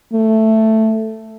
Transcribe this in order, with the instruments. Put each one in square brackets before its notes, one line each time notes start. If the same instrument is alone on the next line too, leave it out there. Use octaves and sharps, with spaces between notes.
[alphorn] A3